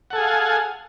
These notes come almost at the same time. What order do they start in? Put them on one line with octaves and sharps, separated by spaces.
F#5 A4 G#5 G#4 F5